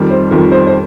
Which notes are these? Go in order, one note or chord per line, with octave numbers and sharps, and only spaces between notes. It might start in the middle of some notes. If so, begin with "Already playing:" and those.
Already playing: F2 D#3 G3
C5
F2 D#3 G3
C5
C5